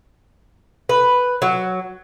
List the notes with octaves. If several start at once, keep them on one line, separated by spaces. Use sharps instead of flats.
B4
F#3